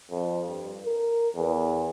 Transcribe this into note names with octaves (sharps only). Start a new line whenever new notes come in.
F2
G2
A#4
E2